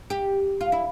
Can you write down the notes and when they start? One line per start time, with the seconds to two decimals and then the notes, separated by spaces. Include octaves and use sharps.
0.10 G4
0.61 F4
0.72 E4